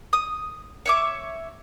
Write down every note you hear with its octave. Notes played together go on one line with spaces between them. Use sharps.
D#6
C#5 E5 D6